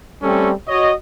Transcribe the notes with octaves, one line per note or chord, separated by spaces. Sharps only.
G3 A3 C4 C#4 A4
F#4 C#5 D#5